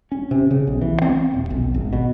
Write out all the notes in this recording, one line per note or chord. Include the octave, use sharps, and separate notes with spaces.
C#4
C3
C#3
B1
E3
C4
D#1
B1
G#1
B2